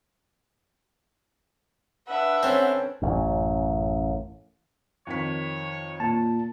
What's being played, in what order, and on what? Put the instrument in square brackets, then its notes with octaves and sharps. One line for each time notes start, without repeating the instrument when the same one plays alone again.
[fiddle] D4 B4 [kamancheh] E5 F#5
[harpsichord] C4 [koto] C#4 A4
[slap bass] A1 F#2
[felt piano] F2 D#3 B6 [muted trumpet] C#5
[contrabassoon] A#2 [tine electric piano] A5